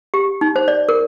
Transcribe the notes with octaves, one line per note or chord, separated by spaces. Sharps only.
G4
D#4
C5
D5
A#4